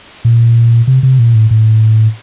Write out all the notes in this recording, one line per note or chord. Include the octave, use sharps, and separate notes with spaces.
A#2
C3
C3
A#2
A2
A2